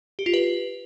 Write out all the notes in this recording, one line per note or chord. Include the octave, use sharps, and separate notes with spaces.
G4
F4
B4